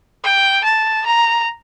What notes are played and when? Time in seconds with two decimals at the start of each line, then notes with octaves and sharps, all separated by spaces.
0.24 G5
0.64 A5
1.06 A#5